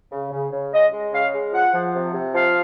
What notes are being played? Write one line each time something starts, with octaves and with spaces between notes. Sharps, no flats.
C#3
C#3
C#3
G#3 D#5
G#3
C#3 F5
G#3
F3 F#5
F3
C3
C3
F3 F5